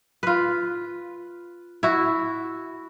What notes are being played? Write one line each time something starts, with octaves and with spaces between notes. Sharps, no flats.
F4 B4
E4 F#4